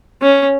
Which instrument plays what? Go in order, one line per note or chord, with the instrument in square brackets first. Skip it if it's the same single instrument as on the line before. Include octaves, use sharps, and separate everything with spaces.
[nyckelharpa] C#4